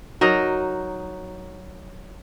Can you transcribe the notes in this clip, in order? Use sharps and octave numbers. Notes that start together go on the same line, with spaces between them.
F#3 D#4 A#4 D#5